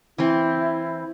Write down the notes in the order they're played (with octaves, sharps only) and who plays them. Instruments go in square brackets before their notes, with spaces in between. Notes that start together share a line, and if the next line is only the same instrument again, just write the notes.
[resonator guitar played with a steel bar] E3 C4 [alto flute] E4